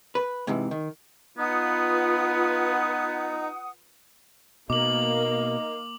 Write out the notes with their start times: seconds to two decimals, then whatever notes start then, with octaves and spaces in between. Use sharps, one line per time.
0.15 B4
0.47 G#2 C3 E3
0.71 D#3
1.38 B3 D#4 F4 B4 F#5 D#6
4.70 B2 A#3 D#4 D6 F#7